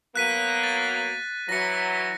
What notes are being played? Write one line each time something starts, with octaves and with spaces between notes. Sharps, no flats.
F#3 A#3 B3 F#6 B6 D#7
A6
E3 F#3 A#6 C#7